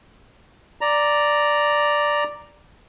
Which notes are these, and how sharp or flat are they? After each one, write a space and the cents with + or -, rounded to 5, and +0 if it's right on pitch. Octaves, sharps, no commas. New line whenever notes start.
D5 +0 A#5 +0